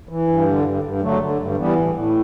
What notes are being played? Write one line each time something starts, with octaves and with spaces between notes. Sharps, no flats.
E3
G2
D3
G2
G2
D3 F#3 A3
D3
G2
E3 G3 B3
A2
A2